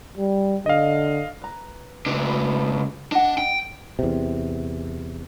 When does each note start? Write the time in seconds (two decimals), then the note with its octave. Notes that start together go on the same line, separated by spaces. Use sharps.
0.17 G3
0.66 D3 D#5 F5
1.42 B4 A#5
2.06 C#2 D4
2.29 B5
3.12 D4 D#5 F#5
3.38 G5
3.99 E2 C3